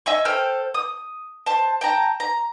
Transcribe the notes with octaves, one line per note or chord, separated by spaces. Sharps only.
D#5 E5 G#5 C#6
A4 C5 G5 F6
D#6
C5 A5
G5 A5 A#5
A#5